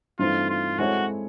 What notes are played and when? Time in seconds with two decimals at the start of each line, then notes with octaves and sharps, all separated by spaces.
0.19 G2 E3 A3 C4 D#4 F4
0.49 F4
0.79 G#3 C4 E4 F#4 A4 C#5